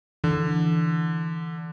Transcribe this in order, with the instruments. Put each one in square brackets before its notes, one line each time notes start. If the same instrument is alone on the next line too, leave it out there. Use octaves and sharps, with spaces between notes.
[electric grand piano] D3 [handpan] E3